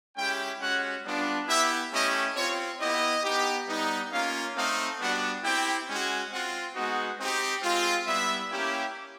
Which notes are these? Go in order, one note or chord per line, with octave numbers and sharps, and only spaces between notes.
G#3 C#4 E4 G4 G5
G#3 C#4 F#4 F#5
G3 B3 D4 F4
B3 E4 G4 E5
A3 C#4 E4 G4 D#5
C4 F4 C#5
B3 E4 G4 D#5
B3 D#4 G4
G3 B3 D#4
A#3 C#4 F4 F5
A3 C4 D#4 F5
G3 B3 D4 F#4 F#5
C4 E4 G4 G5
G#3 C#4 F#4
C4 F4 F#5
G#3 B3 D#4 F#4
C4 D#4 G4
G#3 C4 F4
G3 B3 E4 E5
A#3 C#4 E4 G4